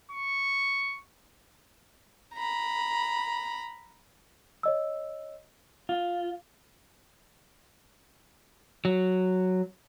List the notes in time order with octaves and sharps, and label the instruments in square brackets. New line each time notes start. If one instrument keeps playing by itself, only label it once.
[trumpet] C#6
[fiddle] A#5 B5
[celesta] C#5 D#5 E6
[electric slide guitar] F4
F#3